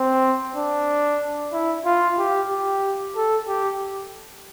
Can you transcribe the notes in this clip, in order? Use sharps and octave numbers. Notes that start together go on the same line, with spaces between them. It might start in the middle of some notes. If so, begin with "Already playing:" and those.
Already playing: C4
D4
E4
F4
G4
G4
A4
G4